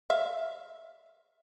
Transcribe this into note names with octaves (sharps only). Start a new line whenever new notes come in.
E5 F5